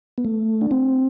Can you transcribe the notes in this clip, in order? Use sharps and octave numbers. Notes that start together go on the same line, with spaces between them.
B3
A3
D4
C4